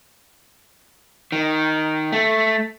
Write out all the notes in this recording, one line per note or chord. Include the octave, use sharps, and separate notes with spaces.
D#3
A3